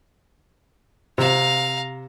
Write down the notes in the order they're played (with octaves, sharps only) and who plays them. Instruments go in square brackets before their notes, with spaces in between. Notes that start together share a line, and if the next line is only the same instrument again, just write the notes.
[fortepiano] C3 [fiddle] F5 A#5